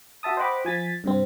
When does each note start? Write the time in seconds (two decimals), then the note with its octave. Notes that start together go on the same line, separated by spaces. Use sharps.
0.23 F#4 E5 A5 D#6
0.37 C5 D#5 F#5 G5 B5 D6
0.65 F3 G#5 A6 B6
1.04 G2 C3 C4